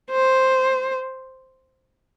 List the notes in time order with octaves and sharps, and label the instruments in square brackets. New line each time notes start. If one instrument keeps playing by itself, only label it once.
[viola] C5